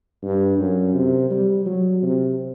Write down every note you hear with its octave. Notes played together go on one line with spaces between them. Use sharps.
G2
F#2
C3
G3
F#3
C3